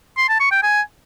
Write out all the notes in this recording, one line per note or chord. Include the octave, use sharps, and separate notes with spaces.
C6
A5
C#6
G5
G#5